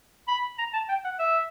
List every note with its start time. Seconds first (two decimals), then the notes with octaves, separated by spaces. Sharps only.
0.28 B5
0.59 A#5
0.73 A5
0.89 G5
1.04 F#5
1.19 E5